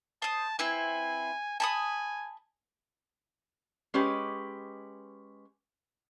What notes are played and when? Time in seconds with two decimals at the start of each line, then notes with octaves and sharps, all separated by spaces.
0.22 C5 A5 D#6
0.59 C4 E4 B4 G#5
1.60 G#5 A5 B5 D#6
3.94 G#3 C#4 G4 B4